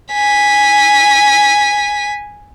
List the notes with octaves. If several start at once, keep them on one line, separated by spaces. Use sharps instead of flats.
G#5 B6